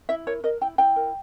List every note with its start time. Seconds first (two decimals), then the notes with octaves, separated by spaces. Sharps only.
0.09 E4 E5
0.27 A#4 C#5
0.44 A#4 D#5
0.61 E4 G5
0.78 E4 G5
0.96 A#4